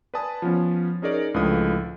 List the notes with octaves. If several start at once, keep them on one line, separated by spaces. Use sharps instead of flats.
B4 D5 G#5 A5 D#6
F3 B3 C#4
C#4 D#4 G#4 A#4 C#5 D5
C#2 A2 D3 F3 B4 D#6